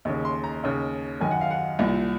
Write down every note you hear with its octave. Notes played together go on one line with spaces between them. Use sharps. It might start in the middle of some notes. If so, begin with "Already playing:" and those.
D#2 C#3
C6
A#5
D#2 C#3
F#2 D#3 G#5
F#5
F5
F#5
C2 A#2